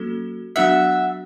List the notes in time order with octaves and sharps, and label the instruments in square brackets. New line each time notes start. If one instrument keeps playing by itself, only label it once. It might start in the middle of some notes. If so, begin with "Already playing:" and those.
Already playing: [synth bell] F#3 A#3 C#4 F#4 A4
[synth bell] F#3 B3 D4 F#4 [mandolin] E5 F#5